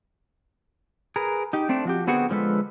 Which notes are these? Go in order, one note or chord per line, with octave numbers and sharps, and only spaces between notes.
G#4 A#4 B4
D#4 G4
A3 C4 D4
F3 F#4 G4
D3 B3 C4 F#4 G#4 F#5
D3 F3 G#3 A4 B4